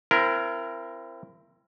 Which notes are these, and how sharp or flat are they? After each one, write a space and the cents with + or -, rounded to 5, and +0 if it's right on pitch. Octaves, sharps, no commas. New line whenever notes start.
C4 +0 E4 +35 A#4 +0